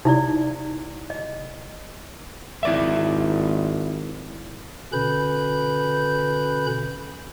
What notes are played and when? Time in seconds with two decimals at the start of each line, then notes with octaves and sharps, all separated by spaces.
0.05 C3 D#4 E4 D5
1.10 D#5
2.63 G#1 E4 D5 E5
4.93 B2 D3 C#4 B4 B5 G6